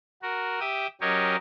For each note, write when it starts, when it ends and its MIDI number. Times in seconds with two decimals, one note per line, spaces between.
0.22 0.59 66
0.22 0.59 70
0.60 0.87 67
0.60 0.87 76
0.60 0.87 79
0.60 0.87 87
1.01 1.36 54
1.01 1.36 61
1.01 1.36 67
1.01 1.36 70
1.01 1.36 73
1.01 1.36 75